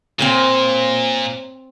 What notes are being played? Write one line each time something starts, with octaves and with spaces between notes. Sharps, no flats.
A#2 C4 C5 C#5